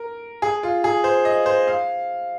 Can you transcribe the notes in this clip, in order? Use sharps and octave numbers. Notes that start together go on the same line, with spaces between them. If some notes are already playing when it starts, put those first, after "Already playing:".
Already playing: A#4
G#4
F4
G#4
C5
D#5
C5
F5